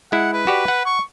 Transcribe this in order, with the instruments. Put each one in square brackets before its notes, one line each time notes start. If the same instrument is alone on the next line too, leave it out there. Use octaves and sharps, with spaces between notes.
[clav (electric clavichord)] G#3 E4 [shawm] F#5
[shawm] B4
[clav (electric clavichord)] F#4 G4 D5
F#5
[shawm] C#6